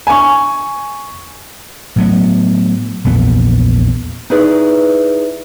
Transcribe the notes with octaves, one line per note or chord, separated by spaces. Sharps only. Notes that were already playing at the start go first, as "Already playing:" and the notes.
G#5 C#6
A2 F#3 B3
A#1 E2 A#2 B3
D#4 E4 G#4 B4 D5